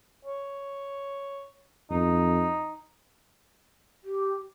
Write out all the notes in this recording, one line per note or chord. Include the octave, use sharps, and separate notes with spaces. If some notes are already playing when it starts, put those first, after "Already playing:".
C#5
F2 D#4
G4